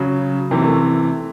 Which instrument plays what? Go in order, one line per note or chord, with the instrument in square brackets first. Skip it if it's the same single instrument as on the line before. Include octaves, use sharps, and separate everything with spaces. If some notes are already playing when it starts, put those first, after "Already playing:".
Already playing: [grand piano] C#3 F#3
C3 E3 A#3
A3